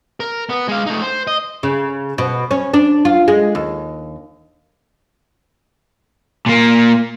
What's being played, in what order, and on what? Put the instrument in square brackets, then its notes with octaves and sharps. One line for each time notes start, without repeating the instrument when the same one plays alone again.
[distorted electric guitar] A#4
B3
G#3 F5
A3 D#4
C5
D#5
[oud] C#3
B2
C#4
D4
F4
G#3
D#2
[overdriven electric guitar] A#2 A#3